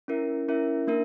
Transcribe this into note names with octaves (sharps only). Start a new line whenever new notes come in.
C#4 E4 A#4 E5
C#4 E4 A#4 E5
A#3 D4 A#4 E5